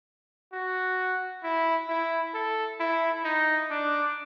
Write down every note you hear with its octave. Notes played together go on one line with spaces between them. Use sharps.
F#4
E4
E4
A4
E4
D#4
D4